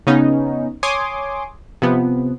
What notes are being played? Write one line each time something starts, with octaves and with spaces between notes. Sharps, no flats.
C#3 B3 C#4 D#4
C#5 G#5 C6 D6 D#6
C3 F3 B3